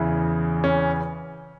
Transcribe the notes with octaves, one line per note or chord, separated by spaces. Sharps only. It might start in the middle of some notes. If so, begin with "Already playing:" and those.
Already playing: E2 C#3 E3
C#4